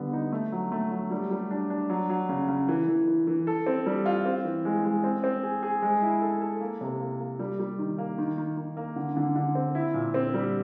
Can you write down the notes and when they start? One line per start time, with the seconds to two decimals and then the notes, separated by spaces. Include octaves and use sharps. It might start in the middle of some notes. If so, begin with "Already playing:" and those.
Already playing: D3 G3 B3
0.13 D#4
0.32 A3
0.52 F#3
0.72 A3
0.91 F#3
1.11 G3
1.31 G3
1.51 D4
1.70 D4
1.90 F#3
2.10 F#3
2.29 C#3
2.48 C#3
2.68 E3
2.88 E3
3.07 E3
3.27 E3
3.47 A4
3.67 C4
3.86 G3
4.06 F4
4.25 C4
4.44 E3
4.65 G#3
4.84 G#3
5.04 C4
5.24 C4
5.43 G#4
5.63 G#4
5.82 G#3
6.02 E4
6.22 A4
6.42 A4
6.61 A#3
6.81 C3
7.01 A#3
7.20 A#3
7.39 G3
7.59 G3
7.79 D#3
7.98 A#3
8.18 D#3
8.38 D#3
8.57 D#3
8.77 A#3
8.96 D3
9.17 D3
9.36 D3
9.55 C4
9.75 E4
9.94 A#2
10.14 C4
10.34 G3